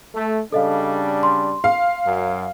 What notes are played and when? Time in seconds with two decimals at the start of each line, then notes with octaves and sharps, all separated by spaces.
0.14 A3
0.52 C#3 G3 D4 A4 D#5 F5
1.23 C6
1.64 F5
2.05 F#2